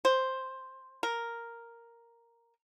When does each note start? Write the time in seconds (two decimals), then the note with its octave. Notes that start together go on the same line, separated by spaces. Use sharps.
0.05 C5
1.03 A#4